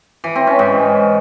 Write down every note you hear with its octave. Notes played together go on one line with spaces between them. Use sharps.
E3
C4
C#4
G#2